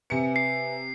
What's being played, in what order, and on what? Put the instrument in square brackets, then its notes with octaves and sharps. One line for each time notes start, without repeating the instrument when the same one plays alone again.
[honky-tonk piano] C3 C#7 [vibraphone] B4 E5 G#5
[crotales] C7